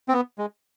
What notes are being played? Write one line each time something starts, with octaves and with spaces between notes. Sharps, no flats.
C4
B3
G#3